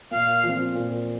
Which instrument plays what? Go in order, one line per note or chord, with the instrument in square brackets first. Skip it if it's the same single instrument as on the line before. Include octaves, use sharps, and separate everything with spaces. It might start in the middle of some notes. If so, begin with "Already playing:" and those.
[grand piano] A#2 [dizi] F5
[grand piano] F3 C4
A#2